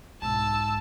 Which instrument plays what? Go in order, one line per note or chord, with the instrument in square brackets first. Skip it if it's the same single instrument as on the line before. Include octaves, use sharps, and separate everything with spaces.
[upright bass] B1 G#2 [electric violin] A5 E6